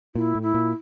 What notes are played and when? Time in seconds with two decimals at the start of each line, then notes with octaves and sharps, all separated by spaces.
0.15 A#2 E4
0.35 A2
0.42 E4
0.54 A#2